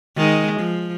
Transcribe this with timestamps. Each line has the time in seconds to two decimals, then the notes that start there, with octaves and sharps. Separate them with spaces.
0.17 D#3 G#3
0.60 F3